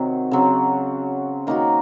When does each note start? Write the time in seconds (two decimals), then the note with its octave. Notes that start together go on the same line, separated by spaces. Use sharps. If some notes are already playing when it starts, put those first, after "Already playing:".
Already playing: C3 D#3 F#3
0.31 C#3 F#3 C4
1.47 D#3 A#3 D#4 F#4